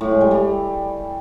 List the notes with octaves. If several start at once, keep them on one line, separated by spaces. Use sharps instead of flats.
A2
G#3
G3
G3